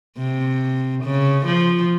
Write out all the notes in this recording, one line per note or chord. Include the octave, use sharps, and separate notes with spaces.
C3
C#3
F3